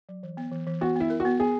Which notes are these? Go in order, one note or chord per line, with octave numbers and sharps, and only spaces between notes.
F#3
E3
B3
E3
E3
B3 F#4
B3 E4
A#4
F#4
B3
B3 G#4